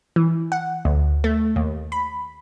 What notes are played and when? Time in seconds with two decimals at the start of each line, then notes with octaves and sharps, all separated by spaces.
0.16 E3
0.52 F#5
0.85 D2
1.24 A3
1.56 D#2
1.92 B5